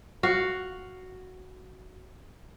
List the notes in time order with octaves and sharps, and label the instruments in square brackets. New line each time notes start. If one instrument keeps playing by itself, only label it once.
[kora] F#4 F5